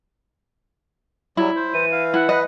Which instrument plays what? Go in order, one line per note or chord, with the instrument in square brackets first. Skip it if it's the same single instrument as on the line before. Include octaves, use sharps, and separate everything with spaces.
[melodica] F#3 G3 [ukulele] E4
[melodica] C5
[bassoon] E3 [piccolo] D#7
[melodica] F5
[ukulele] E4 [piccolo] F#5
[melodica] B4 [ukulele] D#5